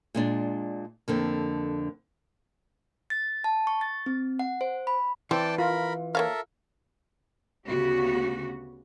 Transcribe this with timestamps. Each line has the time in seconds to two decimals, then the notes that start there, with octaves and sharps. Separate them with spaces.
0.15 A#2 G#3 D4
1.08 F2 D3 A#3
3.10 A6
3.44 A5
3.67 C#6
3.81 A6
4.06 C4
4.39 F#5
4.61 C5
4.87 B5
5.31 E3 C4 D5 G5 A5
5.58 F4 A#4 B5
6.15 A#3 A4 A#4 C#5 E5 F5
7.67 D2 C#3 B3 F#4 G4